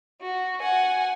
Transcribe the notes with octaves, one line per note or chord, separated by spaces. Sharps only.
F#4
F#5 G#5